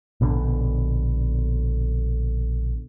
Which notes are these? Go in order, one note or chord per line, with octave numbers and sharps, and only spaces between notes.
A#1 B2 D3